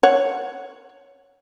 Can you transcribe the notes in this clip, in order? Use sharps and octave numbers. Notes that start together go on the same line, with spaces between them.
C#5 F#5